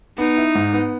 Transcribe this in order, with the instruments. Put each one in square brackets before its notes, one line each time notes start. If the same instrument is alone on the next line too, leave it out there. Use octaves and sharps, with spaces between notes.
[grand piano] B3 [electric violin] D#4
[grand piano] E4
G#2
B3